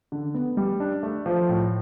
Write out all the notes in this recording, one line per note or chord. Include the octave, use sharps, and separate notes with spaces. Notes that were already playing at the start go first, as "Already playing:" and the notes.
D3
B3
G3
D4
A3
F3
A2